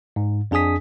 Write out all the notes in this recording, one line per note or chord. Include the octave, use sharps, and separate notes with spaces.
G#2
F2 D4 G#4 G#5 D#6 B6